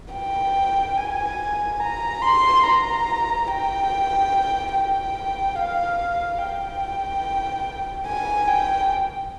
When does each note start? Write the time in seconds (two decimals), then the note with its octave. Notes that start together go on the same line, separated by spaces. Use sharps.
0.14 G5
0.97 G#5
1.80 A#5
2.22 C6
2.64 A#5
3.48 G5
4.73 G5
5.56 F5
6.39 G5
8.07 G#5
8.47 G5